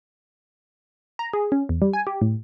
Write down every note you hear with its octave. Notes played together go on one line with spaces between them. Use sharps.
A#5
G#4
C#4
E2
G3
G#5
G4
A2